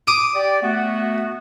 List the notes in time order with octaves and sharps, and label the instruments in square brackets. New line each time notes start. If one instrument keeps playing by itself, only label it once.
[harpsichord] D6 D#6
[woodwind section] G4 D5
A3 B3 F#4